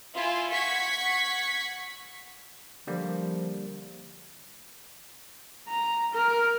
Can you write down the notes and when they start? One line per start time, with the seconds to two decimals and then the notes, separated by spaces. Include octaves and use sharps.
0.15 E4 F4 G#5
0.52 F#5 C#6 G#6 B6
2.87 D3 F3 G3 A#3
5.68 A#5
6.13 A#4